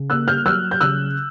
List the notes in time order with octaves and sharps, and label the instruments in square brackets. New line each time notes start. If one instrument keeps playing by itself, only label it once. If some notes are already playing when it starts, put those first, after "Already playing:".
Already playing: [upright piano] C#3
A#3 E6 F#6
F6 G6
F#3 E6 F#6
G6
C#3 E6 F#6